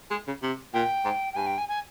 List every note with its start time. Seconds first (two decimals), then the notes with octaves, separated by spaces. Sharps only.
0.11 G#3
0.27 C#3
0.42 C3
0.74 A#2 G5
1.05 G#2
1.33 G5
1.36 G2 G#5
1.47 G5
1.58 G#5
1.69 G#5